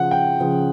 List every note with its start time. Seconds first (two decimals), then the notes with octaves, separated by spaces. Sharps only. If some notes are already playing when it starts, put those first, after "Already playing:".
Already playing: C#3 F3 F#5
0.11 G5
0.40 C#3 F3